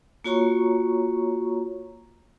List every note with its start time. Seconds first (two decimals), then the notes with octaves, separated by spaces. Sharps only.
0.24 A#3 F4 F#4 C#5 A#5 C#6